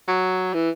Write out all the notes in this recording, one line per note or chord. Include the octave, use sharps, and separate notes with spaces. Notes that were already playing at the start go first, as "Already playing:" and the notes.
F#3
E3